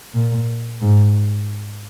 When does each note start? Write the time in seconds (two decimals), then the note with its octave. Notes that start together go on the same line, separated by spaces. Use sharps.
0.14 A#2
0.81 G#2